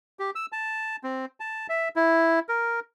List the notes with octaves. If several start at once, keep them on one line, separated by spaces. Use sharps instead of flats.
G4
E6
A5
C4
A5
E5
E4
A#4